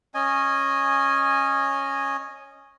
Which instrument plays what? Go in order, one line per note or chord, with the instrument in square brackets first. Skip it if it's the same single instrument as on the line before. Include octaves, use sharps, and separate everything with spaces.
[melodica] C#4 D#5 G#5